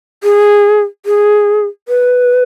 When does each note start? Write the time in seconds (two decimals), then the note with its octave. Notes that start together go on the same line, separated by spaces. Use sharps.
0.23 G#4
1.06 G#4
1.88 B4